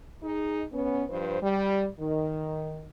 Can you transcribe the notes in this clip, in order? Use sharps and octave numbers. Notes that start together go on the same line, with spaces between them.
D#4 G#4
B3 C#4
G2 F3 B4 C5
G3
D#3